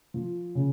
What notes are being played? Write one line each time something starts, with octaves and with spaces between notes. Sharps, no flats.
F3
C#3